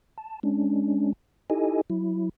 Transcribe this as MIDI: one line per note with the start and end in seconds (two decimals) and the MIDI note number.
0.18 0.40 81
0.43 1.13 56
0.43 1.13 61
0.43 1.13 62
1.50 1.81 63
1.50 1.81 64
1.50 1.81 67
1.50 1.81 69
1.50 1.81 75
1.50 1.81 80
1.90 2.29 54
1.90 2.29 64